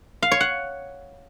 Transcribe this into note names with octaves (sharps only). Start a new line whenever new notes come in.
F5
C#5
F#5